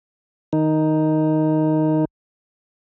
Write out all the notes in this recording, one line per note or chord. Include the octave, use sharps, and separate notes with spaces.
D#3 D#4